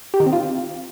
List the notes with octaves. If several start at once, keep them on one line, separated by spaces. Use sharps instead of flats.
G4
D#3
C4
F4